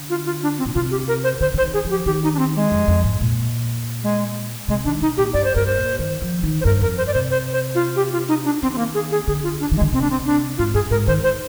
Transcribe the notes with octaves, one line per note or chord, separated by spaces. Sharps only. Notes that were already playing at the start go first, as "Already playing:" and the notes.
Already playing: D3
F4
F4
D4
C4
A#2
C3 F4
G4
A#4
C5
D3 C5
D3
C5
D#3
G#4
F3
G4
D#3 G4
D#4
D4
C4
G#3
F2
F2
G#2
A#2
G#3
C3 G#3
D#3 D4
C3 D#4
A#2 G4
G2 D5
C5
G2 A#4
C5
A#2
D#3
F3
D#3
C5
G2 A#4
F2 A#4
C5
D5
C3 C5
C5
C5
F4
G4
F4
D#4
D4
D#3 C4
C4
A#3
G#4
G#4
D3 G#4
F4
D4
D#3
G#3
D3
C3 C4
D4
C4
D4
G#2 F4
G2 G#4
G#2 A#4
D#3 C5
D#3 C5